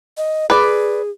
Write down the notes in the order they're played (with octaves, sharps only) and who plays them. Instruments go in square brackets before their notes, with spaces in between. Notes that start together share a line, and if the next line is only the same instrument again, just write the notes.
[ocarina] D#5
[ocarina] G#4 [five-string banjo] B4 D5